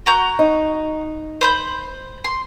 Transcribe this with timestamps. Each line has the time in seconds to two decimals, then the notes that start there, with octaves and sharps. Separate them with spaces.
0.06 F#4 A#5 G6
0.39 D#4
1.41 C5 B5 G6
2.24 C6